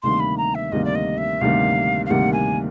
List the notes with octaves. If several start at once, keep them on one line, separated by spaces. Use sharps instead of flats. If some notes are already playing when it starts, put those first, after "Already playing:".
D2 C3 D#3 G3 A#3 C6
B5
A#5
E5
D2 C3 D#3 G3 A#3 D#5
D5
D#5
E5
D2 C3 D#3 G3 A#3 F5
F5
D2 C3 D#3 G3 A#3 F#5
G#5